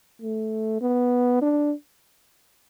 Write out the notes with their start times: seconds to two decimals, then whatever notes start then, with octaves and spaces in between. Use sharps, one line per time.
0.22 A3
0.81 B3
1.42 D4